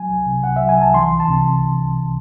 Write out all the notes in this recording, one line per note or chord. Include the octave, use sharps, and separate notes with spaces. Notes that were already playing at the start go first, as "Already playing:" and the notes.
Already playing: F#3 G#5
C2
C3
C2 F#5
E5
F#3
G#5
C2 A5
E3 C6
C#2
A5
C3